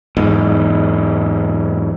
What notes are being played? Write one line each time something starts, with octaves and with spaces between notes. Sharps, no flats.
E2 G#2